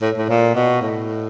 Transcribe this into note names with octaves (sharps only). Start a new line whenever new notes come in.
A2
A2
A#2
B2
A2